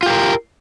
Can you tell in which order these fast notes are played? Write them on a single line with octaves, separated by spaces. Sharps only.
F4 G4 A#4